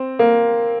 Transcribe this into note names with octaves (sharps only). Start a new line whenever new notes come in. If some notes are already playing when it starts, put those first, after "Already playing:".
Already playing: C4
A#3